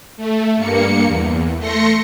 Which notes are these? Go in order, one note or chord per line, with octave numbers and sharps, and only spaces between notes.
A3
G2 A#3 C#7
E2
A3 C6 A#6 C#7